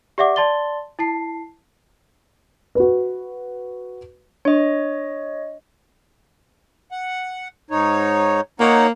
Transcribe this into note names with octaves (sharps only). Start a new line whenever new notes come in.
G4 D5 E5 F#5 D6
D5 A5 C6 A6 G7
E4 A5 C7
F#4 B4
D4 C#5 D#5
F#5
G#2 D#4 C#5
A#3 D#4 C#5 F#5